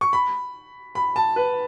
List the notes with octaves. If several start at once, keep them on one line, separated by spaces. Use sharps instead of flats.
C#6
B5
B5
A5
B4